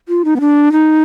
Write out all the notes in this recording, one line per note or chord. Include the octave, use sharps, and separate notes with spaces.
F4
D#4
B3
D4
D#4